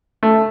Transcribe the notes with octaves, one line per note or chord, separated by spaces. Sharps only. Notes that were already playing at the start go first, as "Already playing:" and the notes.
A3